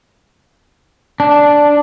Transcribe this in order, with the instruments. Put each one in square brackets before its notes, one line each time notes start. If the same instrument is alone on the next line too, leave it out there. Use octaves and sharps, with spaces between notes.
[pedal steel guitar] D4